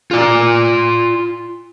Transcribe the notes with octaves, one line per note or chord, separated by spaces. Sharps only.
F4 D5